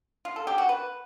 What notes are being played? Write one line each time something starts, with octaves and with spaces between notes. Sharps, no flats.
F4
A4
G4
F#4
B4